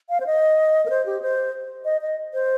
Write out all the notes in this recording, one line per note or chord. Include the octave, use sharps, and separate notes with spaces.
F5
C5
D#5
A#4
C5
G4
C5
D#5
D#5
C5